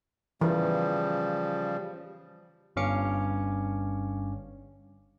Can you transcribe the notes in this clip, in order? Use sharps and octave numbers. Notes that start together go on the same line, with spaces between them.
C#3 E3 F3 G3
G1 G2 C#4 F5 D6 C#7